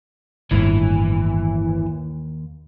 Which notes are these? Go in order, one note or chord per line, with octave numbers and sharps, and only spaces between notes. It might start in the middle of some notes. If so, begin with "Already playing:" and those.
G1 D#2 A2 E3